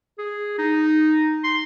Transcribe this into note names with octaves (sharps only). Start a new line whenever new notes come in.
G#4
D#4
C6